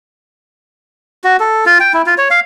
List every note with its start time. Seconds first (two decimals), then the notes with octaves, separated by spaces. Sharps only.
1.24 F#4
1.40 A4
1.66 F4
1.80 G5
1.94 E4
2.06 F4
2.18 C#5
2.31 F5